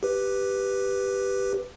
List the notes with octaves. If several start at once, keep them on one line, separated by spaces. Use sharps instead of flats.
G4 B4